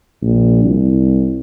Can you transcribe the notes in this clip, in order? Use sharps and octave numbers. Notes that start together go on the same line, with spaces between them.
A#1
C2